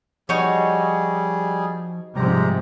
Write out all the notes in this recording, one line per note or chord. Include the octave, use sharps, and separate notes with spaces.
F3 G3 D#4 F#4 G#4 C#5
G#2 C3 F3 G3 G4 A#5